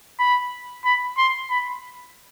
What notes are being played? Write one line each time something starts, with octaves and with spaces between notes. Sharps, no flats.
B5
B5
C6
B5